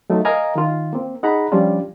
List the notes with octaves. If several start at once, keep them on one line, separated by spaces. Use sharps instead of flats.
F#3 A3 D#4 F4
A#4 D#5 F5 G#5 A#5
D#3 F4
A#3 C4
D#4 G#4 F#5 A#5 B5
F3 G3 C#4 D4 F4